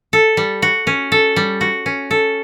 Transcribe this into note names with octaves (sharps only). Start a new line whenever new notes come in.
A4
G3
F#4
C#4
A4
G3
F#4
C#4
A4